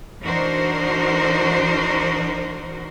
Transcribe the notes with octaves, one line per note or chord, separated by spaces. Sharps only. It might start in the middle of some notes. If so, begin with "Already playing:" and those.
E3 D4 D#4 F#4 A#4 C5